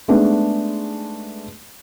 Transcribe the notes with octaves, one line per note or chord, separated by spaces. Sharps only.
G#3 A3 B3 D4 D#4